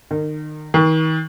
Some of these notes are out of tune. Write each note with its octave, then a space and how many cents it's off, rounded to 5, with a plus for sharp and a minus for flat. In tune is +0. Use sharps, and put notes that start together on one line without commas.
D#3 -30
D#3 +40